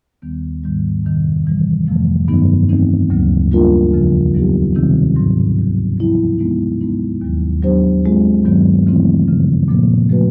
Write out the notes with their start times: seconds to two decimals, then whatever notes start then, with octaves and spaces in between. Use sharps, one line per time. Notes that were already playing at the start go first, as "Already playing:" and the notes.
0.22 D#2 D#3 G3 B3
0.64 G#2 D#3 G3
1.04 F2 C3 D#3
1.46 C3 E3 G3
1.87 F2 C3 F3 A3
2.28 G2 D#3 F#3 B3 D#4
2.69 E3 A3 C4 D#4
3.10 D2 C#3 F#3 A#3
3.51 G3 A#3 D4 F4 A#4
3.92 E2 C#3 F3
4.34 D#3 F#3 B3 D#4 G4
4.75 C3 D#3 G3 C4 D#4
5.16 G#2 D#3 F#3
5.57 D#3 F#3 A#3
5.98 F3 G#3 B3 E4
6.39 G#3 B3 D#4
6.81 G#3 B3 D#4
7.21 D#2 D#3 F#3
7.63 F#3 B3 D4 G4 C5
8.04 G#3 C4 F4 G#4
8.45 G2 D#3 F#3 B3
8.86 C#3 E3 A3 C4 E4
9.27 F#2 C#3 F3
9.68 A#2 F3 A#3
10.09 F3 A3 C#4 F#4 B4